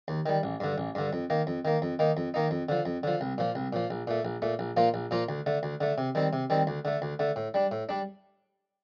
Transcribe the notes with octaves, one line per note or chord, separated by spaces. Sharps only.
D#2
D#3 G3
A1
G2 D3
A1
G2 D3
F2
D#3 A#3
F2
D#3 A#3
F2
D#3 A#3 D#4
F2
D#3 A#3 D#4
F2
D3 F3
F2
D3 F3
C2
A#2 F3
C2
A#2 F3
A#1
A#2 A3
A#1
A#2 A3
A#1
A#2 F3 A#3 F4
A#1
A#2 F3 A#3 F4
D2
D3 A3
D2
D3 A3
C3
D#3 G3 C4
C3
D#3 G3 C4
D2
D3 A3
D2
D3 A3
A2
G3 D4
A2
G3 D4